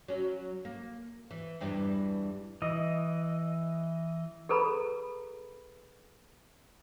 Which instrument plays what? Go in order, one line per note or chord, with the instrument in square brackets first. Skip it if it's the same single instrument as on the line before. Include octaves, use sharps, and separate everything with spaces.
[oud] F#3 C#4
A#3
E3
E2 G2 E3
[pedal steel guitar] E3 D#5
[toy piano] G#4 A4 B4 A#5 B5